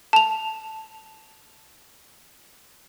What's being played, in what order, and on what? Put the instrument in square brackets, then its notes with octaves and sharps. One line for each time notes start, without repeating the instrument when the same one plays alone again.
[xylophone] A5 F7